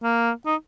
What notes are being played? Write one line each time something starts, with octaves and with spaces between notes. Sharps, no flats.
A#3
D#4